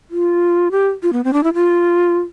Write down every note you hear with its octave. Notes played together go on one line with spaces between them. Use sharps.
F4
G4
F4
B3
C4
D4
E4
F4